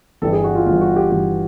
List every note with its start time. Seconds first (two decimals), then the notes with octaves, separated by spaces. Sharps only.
0.22 G1 G2 E3 G3 A4
0.33 G#4
0.44 F#4
0.55 F4
0.66 G1 G2 E3 G3 F4
0.81 F#4
0.96 G4
1.11 G1 G2 E3 G3 G4